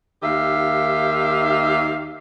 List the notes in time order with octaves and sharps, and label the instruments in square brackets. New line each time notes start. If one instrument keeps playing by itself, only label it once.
[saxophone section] D#2 D#3 G4 E5 F5